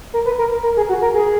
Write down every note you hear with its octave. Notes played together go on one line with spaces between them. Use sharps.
A#4
B4
A#4
A#4
G#4
F#4
A#4
G#4